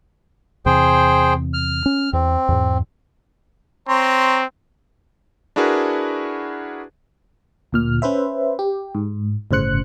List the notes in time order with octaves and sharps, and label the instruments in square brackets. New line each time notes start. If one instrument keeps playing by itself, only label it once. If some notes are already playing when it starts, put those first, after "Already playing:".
[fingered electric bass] E2 C3 [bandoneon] G#4 C5 G5
[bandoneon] F6
[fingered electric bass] C#4
[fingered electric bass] E2 [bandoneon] C4
[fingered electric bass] E2 G#2
[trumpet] C4 [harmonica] C#5 A#5 C6
[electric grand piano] D4 E4 F#4 G#4 A#4 B4
[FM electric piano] D2 A#2 F6
C#4 B4 C5 E5
G4
G#2
G1 A2 C#3 C5 F#6 C#7